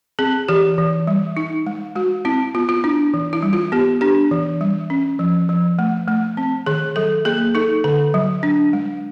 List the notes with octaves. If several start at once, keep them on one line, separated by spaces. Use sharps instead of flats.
C4 G#4
E3 G4
E3
G3
D#4
G#3
G#3 F#4
C4 E4
B3 F4
F4
D4 E4
E3
E4
G3
F4
B3 G4
D4 G4
E3
G3
C#4
F3
F3
A3
A3
C4
D#3 G#4
F#3 A4
A#3 G#4
D#4 A4
D3 A4
F#3
D4
G#3